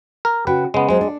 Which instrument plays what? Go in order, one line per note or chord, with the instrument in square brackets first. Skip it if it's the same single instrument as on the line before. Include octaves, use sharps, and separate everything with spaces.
[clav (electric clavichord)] A#4
[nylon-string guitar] C#3 F#4 G5 [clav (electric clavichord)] B4
[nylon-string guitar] C#3 [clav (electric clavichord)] G#3 B3
[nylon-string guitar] F#3 C4 F4 [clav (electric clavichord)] G#3
[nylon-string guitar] D4 A4